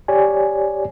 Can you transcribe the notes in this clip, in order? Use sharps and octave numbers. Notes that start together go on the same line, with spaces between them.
G4 C#5 D5 G#5